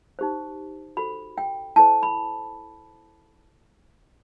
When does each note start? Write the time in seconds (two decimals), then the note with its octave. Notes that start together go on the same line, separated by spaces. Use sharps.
0.19 D#4 G4 C5
0.97 F#4 A4 C5 B5
1.38 G5
1.76 E4 A4 C5 A5
2.03 B5